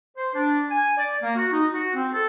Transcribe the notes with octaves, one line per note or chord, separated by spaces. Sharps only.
C5
D4
G#5
D5
A#3
F#4
D#4
F#4
C4
A4